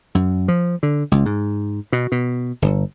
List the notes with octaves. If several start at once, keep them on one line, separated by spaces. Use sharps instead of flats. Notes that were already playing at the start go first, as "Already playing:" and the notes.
F#2
F3
D3
C#2
G#2
B2
B2
G1